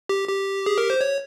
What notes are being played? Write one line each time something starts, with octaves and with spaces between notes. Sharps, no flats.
G4
G4
G#4
A#4
C5
C#5